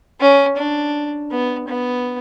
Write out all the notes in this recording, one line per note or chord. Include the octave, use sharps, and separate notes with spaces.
C#4
D4
B3
B3